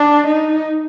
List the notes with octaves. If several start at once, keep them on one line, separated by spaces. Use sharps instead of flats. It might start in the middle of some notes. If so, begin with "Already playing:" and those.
Already playing: D4
D#4